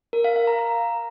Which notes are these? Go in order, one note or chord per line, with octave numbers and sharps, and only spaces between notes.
A#4
F5
F5
A#5
A#5